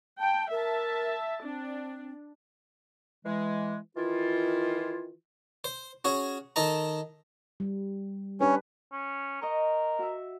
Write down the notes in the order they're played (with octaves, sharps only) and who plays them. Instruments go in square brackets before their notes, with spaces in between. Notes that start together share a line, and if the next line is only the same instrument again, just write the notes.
[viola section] G5 [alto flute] A5
[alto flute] A#4 [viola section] E5 A5
[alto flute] C4 [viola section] D4
[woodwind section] E3 G#3
D#3 E3 E4 F4
[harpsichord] C5
C#4 F#4 G#4
D#3 A4 D#5 A#5
[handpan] G3
[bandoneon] C#4 [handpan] D4 G4 B4
[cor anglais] C#4
[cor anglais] A#4 [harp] D#5 G5 C#6
[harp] F#4 E5